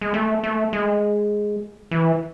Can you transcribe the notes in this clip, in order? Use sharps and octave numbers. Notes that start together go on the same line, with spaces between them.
G#3
A3
A3
G#3
E3